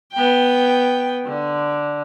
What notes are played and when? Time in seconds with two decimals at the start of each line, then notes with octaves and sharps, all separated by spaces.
0.12 B3 G5
1.25 D3